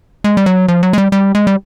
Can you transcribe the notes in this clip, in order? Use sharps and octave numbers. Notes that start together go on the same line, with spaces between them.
G#3
G3
F#3
F3
F#3
G#3
G3
G3
G#3
G3